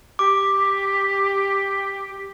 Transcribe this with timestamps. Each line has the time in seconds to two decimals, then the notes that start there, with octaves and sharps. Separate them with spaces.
0.19 G4 D6